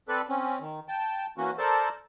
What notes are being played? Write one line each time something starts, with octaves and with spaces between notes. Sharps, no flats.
C4 A4 B4 D5
C4 C#4
D#3
G5 A5
E3 A#3 C#4 F#4
A4 A#4 C5 D5 A5